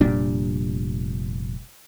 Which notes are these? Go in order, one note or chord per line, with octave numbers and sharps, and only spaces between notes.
F1 A#2 G3 D4